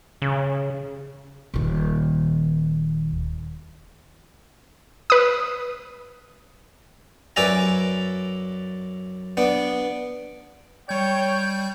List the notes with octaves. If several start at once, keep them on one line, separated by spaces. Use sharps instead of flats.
C#3
D#1 D#3
B4 D#6
F#2 B4 D5 E5 G#5 A#5
B3 D4
G3 C#5 G5 G6